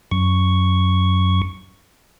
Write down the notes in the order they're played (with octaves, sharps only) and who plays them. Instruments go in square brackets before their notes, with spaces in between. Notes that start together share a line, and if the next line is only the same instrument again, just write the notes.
[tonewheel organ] F#2 C#6